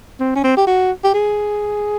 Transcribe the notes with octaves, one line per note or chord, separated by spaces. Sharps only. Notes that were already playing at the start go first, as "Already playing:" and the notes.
C4
C#4
C4
G4
F#4
G4
G#4